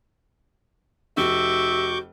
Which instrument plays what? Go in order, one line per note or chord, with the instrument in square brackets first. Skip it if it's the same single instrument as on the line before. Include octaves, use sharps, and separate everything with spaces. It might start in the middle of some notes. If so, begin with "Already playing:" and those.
[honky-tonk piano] F1 [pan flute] F#4 [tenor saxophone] E5 [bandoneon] C#6 D6 G6